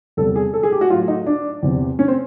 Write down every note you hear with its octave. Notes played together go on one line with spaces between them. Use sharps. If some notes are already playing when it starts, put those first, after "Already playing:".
E2 C3 E3 G3 A4
G#4
A4
G#4
G4
F#4
A2 F#3 F4
D#4
D4
E2 C3 E3
C#4
C4